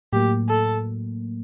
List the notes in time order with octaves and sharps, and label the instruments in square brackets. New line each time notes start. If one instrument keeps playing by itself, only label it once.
[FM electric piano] A2 F#3 A#3 [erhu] G4
[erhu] A4